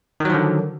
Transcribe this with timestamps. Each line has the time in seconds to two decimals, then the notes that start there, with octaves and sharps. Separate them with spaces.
0.20 D#3
0.25 F#3
0.30 F3
0.34 D3